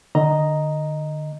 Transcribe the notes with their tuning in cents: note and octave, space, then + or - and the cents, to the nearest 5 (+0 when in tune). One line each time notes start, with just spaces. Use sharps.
D3 +35 D#5 +0 A#5 +0